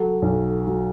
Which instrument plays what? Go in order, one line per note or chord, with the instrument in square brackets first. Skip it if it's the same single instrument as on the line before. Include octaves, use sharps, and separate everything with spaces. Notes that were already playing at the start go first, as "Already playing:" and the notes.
Already playing: [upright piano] F#3 [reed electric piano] A4
[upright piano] B1
F#3